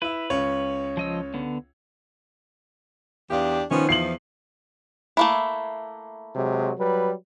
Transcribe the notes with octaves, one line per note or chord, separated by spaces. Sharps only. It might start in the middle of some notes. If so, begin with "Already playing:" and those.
E4 B4 E5
C#2 C#4 C#5
F3 D#5 E6
D3 B3
E2 D4 G4 F5
D#3 F3 B3 C#4
E2 E3 F3 C7 F#7
A3 A#3 E4
C3 F#3 G#3
F#3 G3 B4